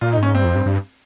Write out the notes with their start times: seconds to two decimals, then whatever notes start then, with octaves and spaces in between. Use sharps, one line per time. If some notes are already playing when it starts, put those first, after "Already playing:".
0.01 A#2 F4
0.13 D#4
0.18 G#2 C#4
0.34 G2 C4
0.45 F2
0.55 G2
0.66 G2